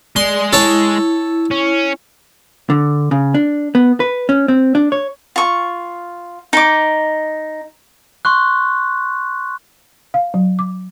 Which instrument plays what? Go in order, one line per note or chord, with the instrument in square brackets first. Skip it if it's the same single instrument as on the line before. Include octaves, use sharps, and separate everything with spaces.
[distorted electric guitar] G#3 [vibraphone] D5 [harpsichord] C6
[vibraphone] E4 [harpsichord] A4 C#5 A5
[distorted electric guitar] C#4
[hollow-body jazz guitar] D3
C#3
D4
B3
B4
C#4
C4
D4
C#5
[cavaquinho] F4 C#6
D#4 D6
[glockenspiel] C6 C#6 F#6
[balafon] F5
F#3
D6